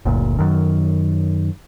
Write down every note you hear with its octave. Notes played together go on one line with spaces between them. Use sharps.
F#1 D2 A#2
F#2 D#3